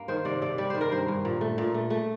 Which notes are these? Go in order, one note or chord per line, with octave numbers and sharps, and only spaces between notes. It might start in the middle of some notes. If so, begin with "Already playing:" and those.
Already playing: G2 A#3
D#3 C5
C3 D5
C3 D5
G3 D5
D#3 C5
A#4
G2 C5
G2
A#2
A3
A#2
A3
A3